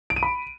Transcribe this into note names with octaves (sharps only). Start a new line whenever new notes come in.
D7
D#7
B5